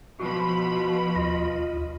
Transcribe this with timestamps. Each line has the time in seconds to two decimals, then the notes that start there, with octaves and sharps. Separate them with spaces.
0.20 B2 F3 F#4 B5
1.16 D#2 F4 D#5